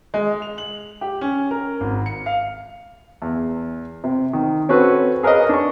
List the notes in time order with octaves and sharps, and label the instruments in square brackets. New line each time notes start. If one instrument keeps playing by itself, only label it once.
[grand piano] G#3
F7
F#7
G4
C#4
A#4
G#1
C#7
F5
[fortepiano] E2
C3
D#3
C4 C#4 F#4 A4 B4
G#4 A#4 B4 C#5 D#5
D4 C#6